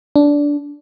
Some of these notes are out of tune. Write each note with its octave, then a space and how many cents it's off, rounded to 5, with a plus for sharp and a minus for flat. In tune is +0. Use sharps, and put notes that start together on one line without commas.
D4 -15